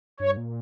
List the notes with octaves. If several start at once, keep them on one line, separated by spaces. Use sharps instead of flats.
G2 C#5
A#2